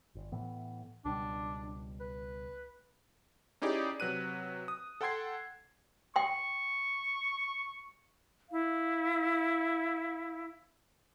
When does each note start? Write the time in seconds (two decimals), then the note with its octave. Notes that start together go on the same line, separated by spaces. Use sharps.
0.15 G1
0.32 A2 E3 B3
1.05 C#2 B2 G3 D4
2.00 B4
3.62 C#4 D#4 E4 G4 G#4 D5
4.00 C3 F#3 B4 F#6 D#7
4.68 D#6
5.01 A4 F#5 G5 C6 G#6 C7
6.16 G5 C6 C#6
8.51 E4 F5